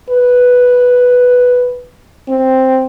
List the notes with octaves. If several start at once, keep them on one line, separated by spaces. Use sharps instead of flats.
B4
C4